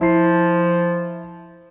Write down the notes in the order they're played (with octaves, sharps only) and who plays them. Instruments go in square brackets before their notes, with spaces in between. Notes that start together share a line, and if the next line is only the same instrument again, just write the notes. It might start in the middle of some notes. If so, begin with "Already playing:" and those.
[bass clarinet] F3 [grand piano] E4 C7